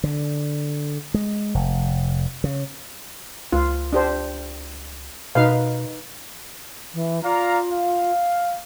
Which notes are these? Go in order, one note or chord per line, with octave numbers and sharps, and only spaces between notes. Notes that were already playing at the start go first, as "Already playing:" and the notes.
D3
G#3
F1
C#3
C#2 F4
D4 G4 C5
B2 D#4 B4 F5
E3
F4 D5 F5 A#5
F5